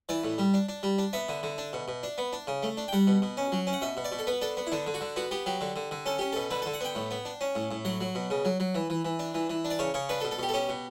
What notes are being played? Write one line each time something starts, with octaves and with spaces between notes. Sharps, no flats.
E3 D5
A2
G3
D4
D4
G3
D4
B3 E5
D3
D3
D4
B2
B2
D4
B3
D4
C#3
A3
D4
G5
G3 F#5
B2
B2
C#4
F#3
C#4
F#5
B2 E5
B2
D5
B2
A4
B3 B4
D4 A4
B3
E4
D3 D4
D3
F#4
D3
B3 F#4
B3 G4
F#3 G4
D3
D3
D3
C#4 A4
C#4 G4
B2 A4
D3 B4
D3 A4
F#5
B3 G5
A2
B3
D4
C#4
A2
A2
F#3 F#5
F#3
B2
C#3
F#3
F#3
E3
E3
E3
D4
E3
E3
D4
D5
C#3 C#5
C#3 C#5
D4 B4
A4
B2
A4
B2 G4
A4
C#4 G4
B2